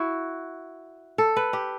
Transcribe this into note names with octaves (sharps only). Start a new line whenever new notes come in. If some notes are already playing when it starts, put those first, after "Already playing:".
Already playing: E4 F#4
A4
B4
G4